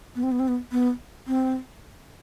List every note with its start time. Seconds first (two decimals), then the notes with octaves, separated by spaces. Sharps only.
0.15 B3
0.23 C4
0.31 B3
0.39 C4
0.48 B3
0.72 B3
1.27 C4